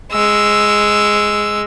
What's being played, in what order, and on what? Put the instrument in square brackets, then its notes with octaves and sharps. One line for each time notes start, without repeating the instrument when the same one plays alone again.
[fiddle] G#3 E6